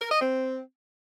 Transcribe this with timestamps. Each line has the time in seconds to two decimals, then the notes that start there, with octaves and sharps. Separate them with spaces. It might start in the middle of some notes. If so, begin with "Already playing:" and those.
0.02 A#4
0.12 D#5
0.22 C4